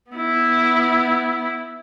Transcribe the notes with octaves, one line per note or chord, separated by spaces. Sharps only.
B3 E4